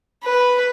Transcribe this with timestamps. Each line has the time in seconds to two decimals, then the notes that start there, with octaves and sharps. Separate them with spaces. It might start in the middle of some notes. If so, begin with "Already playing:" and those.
0.24 B4